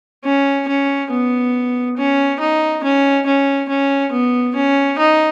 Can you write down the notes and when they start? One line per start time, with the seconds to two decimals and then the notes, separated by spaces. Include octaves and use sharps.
0.25 C#4
0.68 C#4
1.11 B3
1.97 C#4
2.40 D#4
2.84 C#4
3.26 C#4
3.69 C#4
4.12 B3
4.55 C#4
4.99 D#4